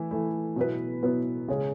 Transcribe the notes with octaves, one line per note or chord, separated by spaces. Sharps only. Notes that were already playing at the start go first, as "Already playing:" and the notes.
Already playing: E3 A3 E4
E3 A3 E4
B2 F#3 B3 E4 B4
B2 F#3 B3 E4 B4
C#3 G#3 C#4 G#4